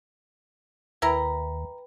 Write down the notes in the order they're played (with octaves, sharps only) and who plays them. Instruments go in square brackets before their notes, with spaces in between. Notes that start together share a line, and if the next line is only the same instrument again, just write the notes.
[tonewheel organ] D#2 [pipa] E4 A#4 A#5 [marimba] B4 G5 B5